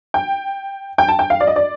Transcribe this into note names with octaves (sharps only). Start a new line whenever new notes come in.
G5
G5
A5
G5
F5
D5
D#5
D5